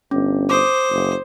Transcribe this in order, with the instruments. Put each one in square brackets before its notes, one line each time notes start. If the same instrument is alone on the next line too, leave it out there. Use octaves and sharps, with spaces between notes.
[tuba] G1 [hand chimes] C#4
[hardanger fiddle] C5 [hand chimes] D6 D#6
[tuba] F#1